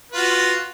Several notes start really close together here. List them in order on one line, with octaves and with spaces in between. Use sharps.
B4 F4 F#4